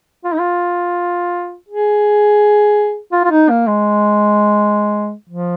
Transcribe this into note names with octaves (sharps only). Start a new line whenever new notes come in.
F4
D#4
F4
G#4
F4
F4
D#4
A#3
G#3
F3